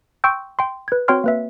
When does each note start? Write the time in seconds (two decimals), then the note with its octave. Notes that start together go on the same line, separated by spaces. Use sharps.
0.24 G5 C6 C#6 E6 G6
0.59 G5 C6
0.88 B4 G#6
1.08 C4 F#4 C#5 G5 C6 F6
1.24 A#3 B4 E5